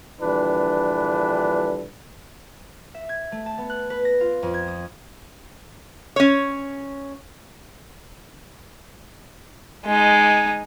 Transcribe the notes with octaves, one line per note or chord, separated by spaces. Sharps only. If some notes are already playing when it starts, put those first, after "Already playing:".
A#1 D3 E3 G3 D4 B4
E5
G#6
A3
A5
B3
F#6
B4
A#6
F4
F2
G#6
D#6
C#4 C#5
G#3 D#4